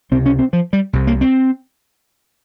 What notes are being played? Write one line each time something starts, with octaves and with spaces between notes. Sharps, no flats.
C#2 C3 C4
C#4
C4
F3
G3
C2 C3
A#3
C4